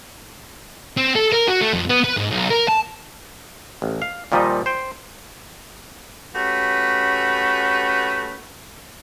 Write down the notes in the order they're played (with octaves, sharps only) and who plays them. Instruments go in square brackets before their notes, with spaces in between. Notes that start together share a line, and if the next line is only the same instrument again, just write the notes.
[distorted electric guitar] C4
A4
A#4
F#4
A3
F2
B3
B4
G#2
B1
A#4
A5
[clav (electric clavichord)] A1
F5
A#2 D#3 F3 G3 D#4 D#5
C5 G5
[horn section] A3 C#4 F#4 G4 B4